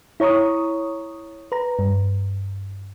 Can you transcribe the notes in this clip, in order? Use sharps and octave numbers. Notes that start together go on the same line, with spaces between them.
E4 C#5 A#5 C#6 D#6
B4 A#5
G2